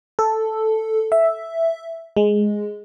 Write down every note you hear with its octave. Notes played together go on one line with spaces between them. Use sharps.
A4
E5
G#3